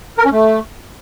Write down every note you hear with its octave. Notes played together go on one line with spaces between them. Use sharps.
A#4
C#4
A3